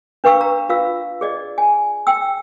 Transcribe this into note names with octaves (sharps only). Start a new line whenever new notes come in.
D4 B4 F5 C#6 E6
A#5
F4 F5 E6
G#4 D5 D#5
G#5
G5 E6